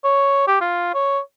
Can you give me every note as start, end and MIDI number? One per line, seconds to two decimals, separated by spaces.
0.04 0.43 73
0.47 0.58 67
0.61 0.91 65
0.94 1.19 73